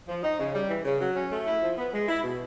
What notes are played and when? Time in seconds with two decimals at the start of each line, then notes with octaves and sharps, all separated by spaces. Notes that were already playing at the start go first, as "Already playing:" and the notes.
0.08 F3
0.23 D#4
0.39 C#3
0.55 G3
0.69 E3
0.85 C#3
1.01 F#3
1.16 C#4
1.31 A3
1.47 E4
1.62 F3
1.78 B3
1.93 G#3
2.09 E4
2.23 B2